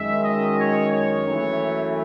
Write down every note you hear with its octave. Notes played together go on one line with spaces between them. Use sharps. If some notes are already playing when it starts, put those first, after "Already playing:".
Already playing: F#2 D#3 G#3 E5
D#5
C#5
C#5
F#2 E3 A3